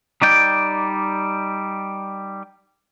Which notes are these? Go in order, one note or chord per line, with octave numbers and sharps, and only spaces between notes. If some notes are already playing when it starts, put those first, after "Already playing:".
G3 D#4 D5 G5